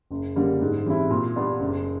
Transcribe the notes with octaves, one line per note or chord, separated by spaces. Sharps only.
F#1
F#2 D3 G3 A#3
G#2
E3 G3 C4 E4
A#2
G3 B3 D4
F#1